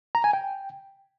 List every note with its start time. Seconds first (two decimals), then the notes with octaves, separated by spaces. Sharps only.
0.15 A#5
0.24 G#5
0.33 G5